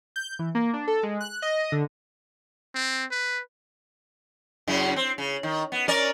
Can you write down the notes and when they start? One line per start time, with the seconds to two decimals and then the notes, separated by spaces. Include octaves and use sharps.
0.16 G6
0.39 E3
0.55 A#3
0.74 D4
0.87 A4
1.03 G#3
1.21 F#6
1.42 D#5
1.72 D3
2.75 C4
3.11 B4
4.68 F#2 C#3 E4
4.96 C4
5.18 C#3
5.43 D#3
5.72 B3
5.88 C#4 A#4 D5